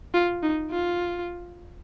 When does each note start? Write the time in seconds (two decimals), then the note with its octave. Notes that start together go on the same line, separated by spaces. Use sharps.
0.14 F4
0.43 D#4
0.71 F4